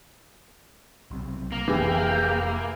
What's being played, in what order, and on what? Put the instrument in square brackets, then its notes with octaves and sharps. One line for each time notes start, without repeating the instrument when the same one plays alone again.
[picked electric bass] B1 C3
[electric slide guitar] A#3
[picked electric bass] F1 [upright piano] E3 [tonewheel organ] G4 G#4 G5